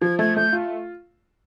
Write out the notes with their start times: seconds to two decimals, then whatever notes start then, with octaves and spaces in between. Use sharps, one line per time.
0.02 F3 G#6
0.19 A3 G#6
0.36 A3 G6
0.53 F4